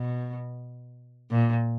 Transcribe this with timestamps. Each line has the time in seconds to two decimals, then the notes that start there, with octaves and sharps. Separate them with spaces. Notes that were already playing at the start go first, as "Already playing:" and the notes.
Already playing: B2
1.31 A#2